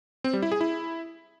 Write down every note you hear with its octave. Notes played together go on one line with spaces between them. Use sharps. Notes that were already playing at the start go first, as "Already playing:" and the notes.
C4
G3
E4
G#4
E4